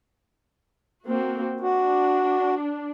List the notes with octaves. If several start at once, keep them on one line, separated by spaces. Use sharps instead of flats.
A#3 C4 F#4
D4 F#4